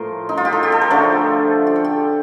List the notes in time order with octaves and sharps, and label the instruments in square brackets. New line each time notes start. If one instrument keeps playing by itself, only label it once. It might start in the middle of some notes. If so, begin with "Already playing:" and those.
Already playing: [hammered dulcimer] A2 F3 A3 F4 A#4 C5
D#4
F4
G4
A4
G4
A4
A#4
D3 F3 A3 A4
G4
A4
G4